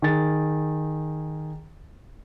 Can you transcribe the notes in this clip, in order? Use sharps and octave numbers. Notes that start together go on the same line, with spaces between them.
D#3 G#4 A6